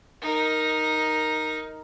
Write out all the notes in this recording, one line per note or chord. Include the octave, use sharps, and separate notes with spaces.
D#4 A#4